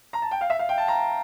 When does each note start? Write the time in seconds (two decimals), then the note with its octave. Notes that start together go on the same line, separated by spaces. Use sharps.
0.13 A#5
0.22 A5
0.31 G5
0.41 F5
0.50 E5
0.59 F5
0.69 G5
0.78 A5
0.88 A#5